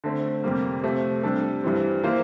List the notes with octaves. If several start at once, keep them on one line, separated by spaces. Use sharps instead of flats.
D3 A3 C4
F2 C3 G3 A#3
C3 F3 A3
C3 G3 D4 A4
G2 E3 G3 C4
E3 A#3 F4 C5